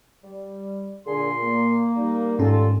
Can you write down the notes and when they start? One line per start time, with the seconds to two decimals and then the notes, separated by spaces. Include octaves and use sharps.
0.23 G3
1.07 A#2 D3 G#4 C6
1.44 A#3
1.96 G3 D#4
2.39 G#2 D#3 C#4 F4 A4